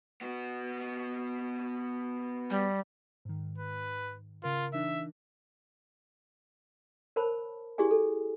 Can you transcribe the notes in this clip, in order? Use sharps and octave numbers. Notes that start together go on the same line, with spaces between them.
B3 F#4
G3
G#2 D#3
B4
C#3 F4 A#4
E3 D4 D#4 E5
A#4 C5 C#5 A5 B5
E4 G4 G#4 D5 G#5
A4